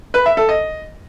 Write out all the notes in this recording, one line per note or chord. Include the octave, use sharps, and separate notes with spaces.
B4
E5
A4
D#5